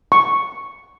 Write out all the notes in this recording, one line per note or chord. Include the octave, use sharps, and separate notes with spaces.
C#6